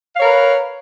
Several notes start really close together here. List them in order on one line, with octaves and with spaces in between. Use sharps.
F5 C#5 A#4 B4